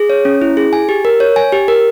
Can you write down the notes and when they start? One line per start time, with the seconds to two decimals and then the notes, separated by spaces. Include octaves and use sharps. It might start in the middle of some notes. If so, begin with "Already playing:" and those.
Already playing: G#4
0.10 C#5
0.25 C#4
0.42 E4
0.57 G#4
0.73 G#5
0.89 G4
1.05 A#4
1.20 C#5
1.36 G#5
1.52 G4
1.68 A#4